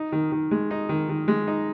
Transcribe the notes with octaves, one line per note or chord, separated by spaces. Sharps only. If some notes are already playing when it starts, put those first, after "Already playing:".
Already playing: D#4
D#3
D#3
G#3
D#4
D#3
D#3
G#3
D#4